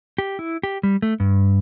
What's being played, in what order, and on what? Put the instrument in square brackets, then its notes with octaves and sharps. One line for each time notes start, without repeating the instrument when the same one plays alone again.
[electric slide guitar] G4
E4
G4
G3
A3
G2